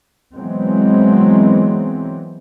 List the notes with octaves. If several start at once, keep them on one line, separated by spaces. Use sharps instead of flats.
E3 F#3 G#3 B3 C4